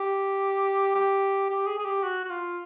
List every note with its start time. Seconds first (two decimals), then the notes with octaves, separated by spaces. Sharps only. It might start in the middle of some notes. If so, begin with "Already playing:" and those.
Already playing: G4
0.95 G4
1.50 G4
1.67 G#4
1.78 G#4
1.85 G4
2.03 F#4
2.25 F#4
2.30 F4